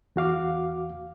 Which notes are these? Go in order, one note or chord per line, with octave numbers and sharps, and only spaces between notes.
E2 F#4 F5 D6